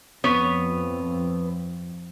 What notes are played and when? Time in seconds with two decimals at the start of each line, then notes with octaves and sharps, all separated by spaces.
0.24 F2 B3 B4 C#5